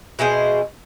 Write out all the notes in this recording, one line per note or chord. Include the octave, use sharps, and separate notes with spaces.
B2 E4 G#4 C5